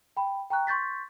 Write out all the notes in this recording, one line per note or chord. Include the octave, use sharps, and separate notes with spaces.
G5 B5
G5 A#5 C#6 F#6
C6 C#6 G6 A6 B6